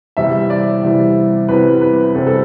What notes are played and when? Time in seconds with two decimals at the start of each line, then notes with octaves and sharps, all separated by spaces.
0.17 E2 C3 E3 G3 C4 E5
0.50 D5
0.83 E2 C3 E3 G3 C4
1.48 E2 C3 E3 G3 C4 B4
1.81 B4
2.15 E2 C3 E3 G3 C4 A4
2.27 A4